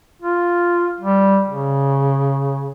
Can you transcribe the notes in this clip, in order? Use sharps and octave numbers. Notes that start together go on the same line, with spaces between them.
F4
G3
C#3